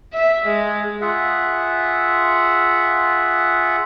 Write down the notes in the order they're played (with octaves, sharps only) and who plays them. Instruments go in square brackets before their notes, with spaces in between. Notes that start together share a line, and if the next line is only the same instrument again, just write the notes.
[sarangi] E5
G#3
[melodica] F4 G#4 E5 F#5